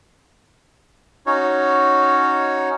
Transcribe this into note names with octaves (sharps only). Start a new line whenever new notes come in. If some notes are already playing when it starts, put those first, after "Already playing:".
C#4 D#4 F#4 C#5